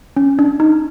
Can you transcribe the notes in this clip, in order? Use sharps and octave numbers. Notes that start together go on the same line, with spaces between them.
C#4
D4
D#4